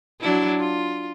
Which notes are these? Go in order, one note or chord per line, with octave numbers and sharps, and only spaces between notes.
F#3 D4 E4
F4